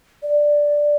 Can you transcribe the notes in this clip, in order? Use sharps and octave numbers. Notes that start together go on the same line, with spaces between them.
D5